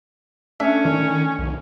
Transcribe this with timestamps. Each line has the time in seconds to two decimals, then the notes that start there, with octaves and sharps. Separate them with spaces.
0.60 A3 C#4 D4 E5
0.85 D#3
1.38 B1